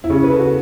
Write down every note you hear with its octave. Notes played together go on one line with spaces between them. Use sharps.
E4
C#3 C#4
B4
A4
F#4